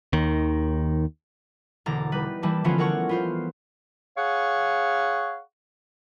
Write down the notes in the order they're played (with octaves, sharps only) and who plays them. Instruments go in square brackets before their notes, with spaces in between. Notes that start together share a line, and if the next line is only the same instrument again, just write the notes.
[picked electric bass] D#2 D#3
[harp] E1 D3 A#3 A#5 A6
G3 D#4 B4
E3 G3 A#3 A5
D3 E3 F3 B3 C#4 F4
A4 A#4 C#5 F#5 C#6
B3 F4 C5
[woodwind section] G#4 C#5 F5 F#5 C#6